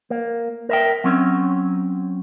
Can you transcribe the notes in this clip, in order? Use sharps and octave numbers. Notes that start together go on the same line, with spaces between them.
A#3
A#4 E5 G5
F#3 C4 C#4